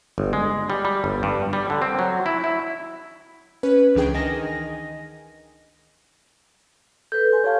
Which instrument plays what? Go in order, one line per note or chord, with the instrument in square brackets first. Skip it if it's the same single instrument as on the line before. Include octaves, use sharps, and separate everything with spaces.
[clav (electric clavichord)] G1
G#3
G3
G3
G1
G2
G3
D3
C4
F#3
E4
E4
[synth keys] C#4 B4
C#2 E3 D4 G#4 G5
D#3 D#5 G#5 A#6
[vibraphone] A4 B4 [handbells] G6
[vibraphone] G#5 C6
[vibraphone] G4 A5 C#6 [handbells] C#5 F5